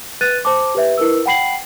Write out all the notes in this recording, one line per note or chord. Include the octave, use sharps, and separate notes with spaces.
B4 F#6 A6 D#7
C5 A5 D6
G4 B4 E5
E4 A#4 B4 E6
F#5 G5 B5 C7 F#7